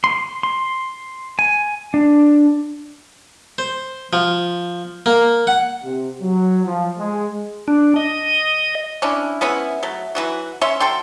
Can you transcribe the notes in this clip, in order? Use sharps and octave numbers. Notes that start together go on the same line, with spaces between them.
C6
C6
G#5
D4
C5
F3
A#3
F#5
C3
F#3
F3
G#3
D4
D#5
C#4 D4 E4
G#3 B3 C#4 E4
F#3 A3
E3 F#3 F#4
C#4 C#5 E5 C6
F#3 A4 G5 C6